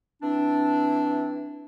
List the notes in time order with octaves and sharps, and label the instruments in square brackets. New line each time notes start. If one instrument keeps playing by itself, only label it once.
[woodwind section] E3 C4 D4